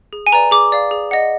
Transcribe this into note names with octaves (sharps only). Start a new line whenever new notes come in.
G#4
G#5
B4 D5 A#5
G#4 D6
D5 F5
G#4
D#5 F#5